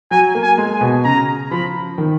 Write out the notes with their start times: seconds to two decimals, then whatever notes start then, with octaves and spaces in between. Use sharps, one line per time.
0.11 F#3 G#5
0.35 A#3
0.43 G#5
0.58 G#3
0.74 G#5
0.81 B2
1.05 C#3 A#5
1.51 F3 B5
1.98 D#3